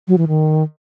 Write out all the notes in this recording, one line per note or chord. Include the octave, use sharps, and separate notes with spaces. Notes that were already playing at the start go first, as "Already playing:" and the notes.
F#3
E3
D#3